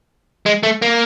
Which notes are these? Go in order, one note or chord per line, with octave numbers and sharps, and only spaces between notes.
G#3
A3
A#3